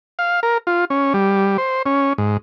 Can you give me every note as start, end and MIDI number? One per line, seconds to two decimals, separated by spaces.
0.19 0.40 77
0.43 0.58 70
0.67 0.85 65
0.90 1.13 61
1.14 1.57 55
1.58 1.82 72
1.86 2.13 61
2.18 2.37 44